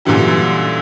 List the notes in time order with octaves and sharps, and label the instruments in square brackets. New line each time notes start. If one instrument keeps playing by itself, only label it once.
[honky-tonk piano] F#2 A#2 D3 E3 G3